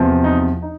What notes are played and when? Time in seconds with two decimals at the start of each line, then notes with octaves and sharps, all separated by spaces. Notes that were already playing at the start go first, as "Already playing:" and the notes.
Already playing: E2 C3 F3
0.24 D#4
0.62 D#4